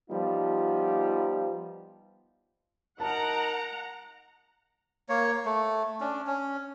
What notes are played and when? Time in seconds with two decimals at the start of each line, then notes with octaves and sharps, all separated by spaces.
0.10 F3 G3 B3 D#4 F4
3.00 D#4 A#4 F#5 A5 A#5
5.09 A#3 C#5
5.45 A3
6.00 C#4 D4
6.27 C#4